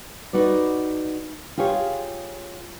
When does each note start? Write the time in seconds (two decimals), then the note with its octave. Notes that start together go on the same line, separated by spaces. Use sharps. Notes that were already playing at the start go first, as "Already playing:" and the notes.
0.33 D#4 F#4 B4 D5
1.58 F4 G4 G#4 C#5 F5